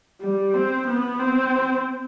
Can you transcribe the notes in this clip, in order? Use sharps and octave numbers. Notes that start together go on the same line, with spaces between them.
G3
C4
B3
C4